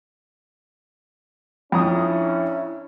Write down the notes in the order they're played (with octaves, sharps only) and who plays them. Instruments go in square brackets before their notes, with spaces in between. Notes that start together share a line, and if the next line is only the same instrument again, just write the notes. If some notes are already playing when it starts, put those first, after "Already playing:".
[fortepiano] F2 A#5 D#6 [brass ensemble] C#4 D4 E4